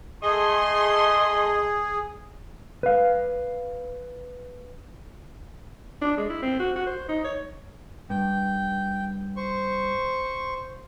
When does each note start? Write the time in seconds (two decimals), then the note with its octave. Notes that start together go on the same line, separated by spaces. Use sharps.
0.23 A3 G#4 D#5 C6
2.83 B4 F5
6.02 D4
6.17 G#3
6.29 E4
6.42 C4
6.60 F#4
6.76 F#4
6.87 C5
7.08 D#4
7.24 C#5
8.10 G2 G5
9.36 C5 C#6